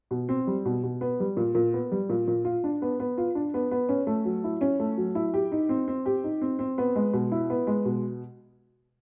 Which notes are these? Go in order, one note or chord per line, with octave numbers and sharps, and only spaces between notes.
B2
C4
G3
B2
B2
B3
G3
A#2
A#2
B3
G3
A#2
A#2
F4
D4
B3
B3
F4
D4
B3
B3
C#4
A3
F#3
E4
C#4
A3
F#3
E4
G4
D#4
C4
C4
G4
D#4
C4
C4
B3
G#3
B2
E4
B3
G#3
B2